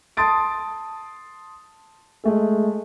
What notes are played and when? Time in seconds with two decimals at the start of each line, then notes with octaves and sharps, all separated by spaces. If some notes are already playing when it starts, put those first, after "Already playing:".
0.17 A5 C6 D#6 A6 D7
2.24 G#3 A3 G#4